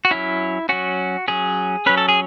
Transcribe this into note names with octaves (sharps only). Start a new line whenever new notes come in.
F#4
F#3 C#4 E4
F#3 C#4 F#4
F#3 C#4 G#4
F#3 C#4 B4
A4
G#4